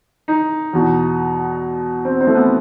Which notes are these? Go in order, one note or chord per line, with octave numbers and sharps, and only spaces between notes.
D#4
E2 B2
C4
C4
A3
B3